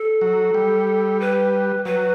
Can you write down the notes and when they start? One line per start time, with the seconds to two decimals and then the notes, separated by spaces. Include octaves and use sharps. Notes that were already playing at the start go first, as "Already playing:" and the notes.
Already playing: A4
0.21 F#3
0.54 G3
1.20 B4
1.85 F#3 B4